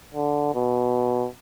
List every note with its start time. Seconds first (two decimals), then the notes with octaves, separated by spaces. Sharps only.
0.14 D3
0.55 B2